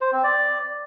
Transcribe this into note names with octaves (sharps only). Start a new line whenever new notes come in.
C5
C4
D5